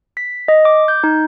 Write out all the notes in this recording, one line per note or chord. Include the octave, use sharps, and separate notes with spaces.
B6
D#5
D6
G6
D#4